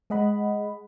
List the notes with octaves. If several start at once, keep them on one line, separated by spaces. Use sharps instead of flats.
G#3 G#4 D#5 F#5 B5